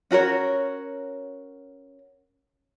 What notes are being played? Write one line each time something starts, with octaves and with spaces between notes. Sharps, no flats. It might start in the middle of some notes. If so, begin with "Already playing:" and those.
C#4 F#4 A#4 C#5